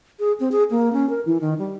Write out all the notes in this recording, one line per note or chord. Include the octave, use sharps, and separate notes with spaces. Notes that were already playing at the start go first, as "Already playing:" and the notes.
G#4
C4
G#4
A#3
C#4
A#4
E3
D#3
G3